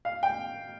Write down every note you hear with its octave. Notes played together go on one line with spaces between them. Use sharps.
F5
G5